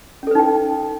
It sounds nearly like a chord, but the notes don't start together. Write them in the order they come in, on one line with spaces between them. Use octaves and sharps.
C#4 A4 B4 D#4 G5